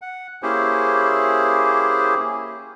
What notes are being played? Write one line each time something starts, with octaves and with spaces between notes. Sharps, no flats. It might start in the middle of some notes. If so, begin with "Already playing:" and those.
F#5
A#3 C#4 E4 G4 G#4 C5